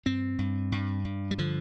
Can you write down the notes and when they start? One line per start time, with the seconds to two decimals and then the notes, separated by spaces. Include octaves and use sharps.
0.06 G2 C4
0.39 G2
0.72 G2
1.05 G2
1.31 G3
1.38 D3 F3